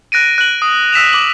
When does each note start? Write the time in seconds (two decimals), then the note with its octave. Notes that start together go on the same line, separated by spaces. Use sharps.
0.12 F#6 A#6 D7 D#7
0.38 F#6 D7 F#7
0.62 D#6
0.92 E6 B6 E7 F7
1.13 D6 F#7